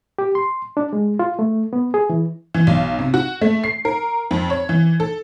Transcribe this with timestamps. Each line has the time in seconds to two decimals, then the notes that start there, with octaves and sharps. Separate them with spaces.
0.19 G4
0.35 C6
0.77 D4
0.93 G#3
1.19 F4
1.39 A3
1.73 B3
1.94 G#4
2.10 E3
2.54 E3
2.67 B1
2.99 C3
3.14 F#4
3.41 A3
3.64 C7
3.85 A#4
4.31 F2
4.50 C#5
4.69 E3
5.00 A4